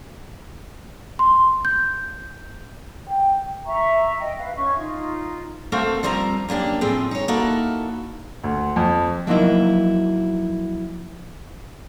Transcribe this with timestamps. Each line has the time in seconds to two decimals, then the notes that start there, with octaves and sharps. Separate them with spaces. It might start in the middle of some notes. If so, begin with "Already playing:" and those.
1.19 C6
1.65 G6
3.10 G5
3.66 E5 A#5 C#6
4.19 D#5 G5
4.38 B4 E5 F5
4.56 C#4 E5 C#6
4.76 D#4 F4
5.72 A3 C4 F#4 A4 A#4 F5
6.03 F3 G3 C4 A#4 A#5
6.49 F#2 A#3 D4 G4
6.81 A2 F3 C4 G#4
7.11 D#4 C#5
7.28 A#3 D#4 E4 F#4 A4
8.43 D2
8.76 F2
9.27 F3 F#3 A#3 D#4 E4